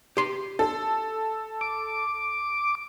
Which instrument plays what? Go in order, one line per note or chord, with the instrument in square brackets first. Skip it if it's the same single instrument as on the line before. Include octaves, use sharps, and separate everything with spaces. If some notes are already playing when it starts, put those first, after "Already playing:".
[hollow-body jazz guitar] G4 C6
[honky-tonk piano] A4
[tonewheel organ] D6